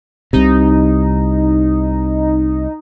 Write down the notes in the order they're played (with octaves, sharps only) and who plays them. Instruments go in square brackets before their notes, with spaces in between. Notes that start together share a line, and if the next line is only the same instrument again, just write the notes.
[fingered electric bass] C2 C3 [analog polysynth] D#4